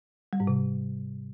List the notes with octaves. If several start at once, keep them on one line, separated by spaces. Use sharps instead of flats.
G3
G#2
C3